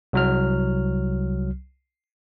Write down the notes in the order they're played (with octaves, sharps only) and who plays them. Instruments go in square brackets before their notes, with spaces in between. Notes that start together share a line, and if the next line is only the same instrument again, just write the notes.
[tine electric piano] C2 F#3 F6